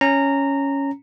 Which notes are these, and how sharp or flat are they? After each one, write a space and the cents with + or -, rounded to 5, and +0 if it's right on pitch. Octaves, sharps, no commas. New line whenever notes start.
C#4 +0 A#5 -15